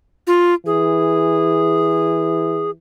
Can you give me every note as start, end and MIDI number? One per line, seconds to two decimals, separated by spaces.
0.27 0.54 65
0.66 2.75 52
0.66 2.71 68